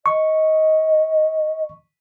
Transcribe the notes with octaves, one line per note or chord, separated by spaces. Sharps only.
D#5 C#6